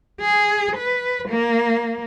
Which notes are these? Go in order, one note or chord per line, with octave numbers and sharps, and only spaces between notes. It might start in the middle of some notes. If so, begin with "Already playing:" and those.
G#4
B4
A#3